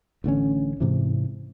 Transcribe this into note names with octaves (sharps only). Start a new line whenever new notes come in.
A1 D3 A3 C#4
G#2 C3 E3